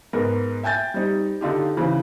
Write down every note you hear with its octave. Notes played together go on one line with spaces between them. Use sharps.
G#2 B3 A#4
E5 G5 G#5 G6 A6
G3 C4 D#4
D3 D#4 F4 G4
C#3 E3 C4